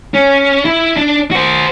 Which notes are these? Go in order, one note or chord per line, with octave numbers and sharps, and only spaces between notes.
C#4
E4
D4
F#4 C5